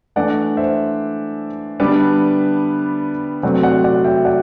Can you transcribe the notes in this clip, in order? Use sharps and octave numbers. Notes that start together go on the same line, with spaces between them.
E3 A3 D4 D5 F#5
C5 E5
D3 G3 B3 D4 B4 D5
C3 F#3 A3 C4 D5 F#5
D5 F#5
D5 F#5
E5 G5
D5 F#5